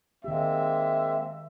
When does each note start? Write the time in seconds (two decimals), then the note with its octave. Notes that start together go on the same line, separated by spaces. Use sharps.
0.24 D#3 G#3 A#3 C4 G4 E5